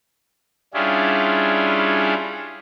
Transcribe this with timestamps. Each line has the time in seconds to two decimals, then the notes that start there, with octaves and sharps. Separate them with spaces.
0.74 G3 C#4 D4 E4 F4 G#4